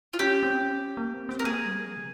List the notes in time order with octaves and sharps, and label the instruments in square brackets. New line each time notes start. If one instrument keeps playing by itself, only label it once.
[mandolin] F4
[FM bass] C#4 [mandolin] G4
[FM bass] C4
C#4
A#3
C4
C4
[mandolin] A#4
[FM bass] A#3 [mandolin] G#4
[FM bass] G3
F3
C#3